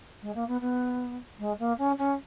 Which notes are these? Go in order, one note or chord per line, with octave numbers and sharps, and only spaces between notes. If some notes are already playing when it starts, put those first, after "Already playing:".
G#3
A#3
B3
B3
G#3
A#3
C#4
C#4